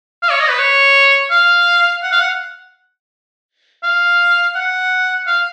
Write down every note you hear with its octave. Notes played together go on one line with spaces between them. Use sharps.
F5
C#5
D#5
B4
C#5
F5
F#5
F5
F#5
F5
F#5
F5